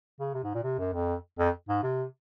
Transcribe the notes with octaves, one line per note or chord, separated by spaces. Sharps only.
C#3
C3
G#2
A#2
C3
F#2
F2
F2
G#2
C3